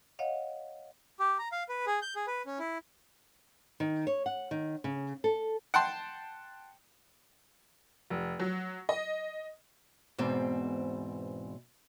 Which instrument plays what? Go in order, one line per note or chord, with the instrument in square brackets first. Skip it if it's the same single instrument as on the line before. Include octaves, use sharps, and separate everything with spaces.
[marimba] C#5 D#5 F5 F#5
[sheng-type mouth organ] G4
A#5
F5
B4
G#4
G6
G#4
B4
C#4
E4
[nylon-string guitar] D#3
C#5
F#5
D#3
C#3
A4
[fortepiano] F#5 G5 A5 C6
[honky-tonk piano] F1
F#3
D#5
[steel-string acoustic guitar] E2 G#2 B2 C4